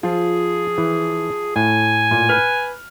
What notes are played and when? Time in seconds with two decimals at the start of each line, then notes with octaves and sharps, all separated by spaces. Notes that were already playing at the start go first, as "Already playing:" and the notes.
0.03 F3 F4 G#4
0.78 E3
1.56 A2 G#5
2.11 A#2
2.29 B4 F6